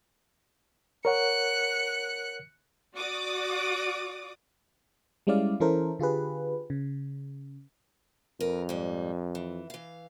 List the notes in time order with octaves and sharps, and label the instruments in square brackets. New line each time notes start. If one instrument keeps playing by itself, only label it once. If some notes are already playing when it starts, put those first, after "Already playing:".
[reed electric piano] A#4 C#5 F#5 [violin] F#6 C#7
[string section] F#4 D5 D6 D#6
[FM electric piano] G3 G#3 C#4 E4 D5 F5
E3 C#4 E4 A4 A#4 C5
D3 F4 G4 G#4 B4
C#3
[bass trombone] F2 [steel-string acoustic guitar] A#4 B4
[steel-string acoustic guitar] G#2 G3
E3
E3 F5